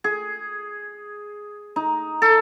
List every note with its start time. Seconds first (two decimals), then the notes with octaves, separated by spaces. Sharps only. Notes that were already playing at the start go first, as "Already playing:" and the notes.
0.04 G#4
1.76 D#4
2.22 A4